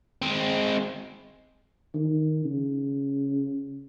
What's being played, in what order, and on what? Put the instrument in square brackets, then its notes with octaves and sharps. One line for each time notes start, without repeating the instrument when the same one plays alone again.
[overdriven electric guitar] G#3 C4
[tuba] D#3
C#3